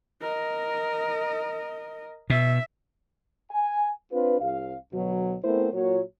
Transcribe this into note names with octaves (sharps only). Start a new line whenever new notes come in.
A#4 D#5
B2 E5
G#5
C4 D4 F4 B4
C2 F5
D2 B2 F#3
A3 B3 C4 E4 A#4 C5
A#2 F#3 C#5